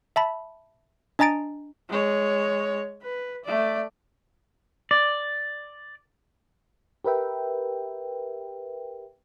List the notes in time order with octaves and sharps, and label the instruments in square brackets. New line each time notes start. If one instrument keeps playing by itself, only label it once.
[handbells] E5 A5 B5
D4 D#5 G#5 A#5 A6 D7
[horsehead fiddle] G#3 C#5
B4
A3 D5
[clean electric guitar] D5
[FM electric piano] G4 A#4 B4 E5 G5